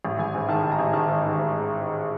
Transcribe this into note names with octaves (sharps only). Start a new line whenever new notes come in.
A1
A1 G#5
G#2 G#5
D#3 A5
D#3 A5
A#5
A1
D#3 A5
G#2
D#3
G#2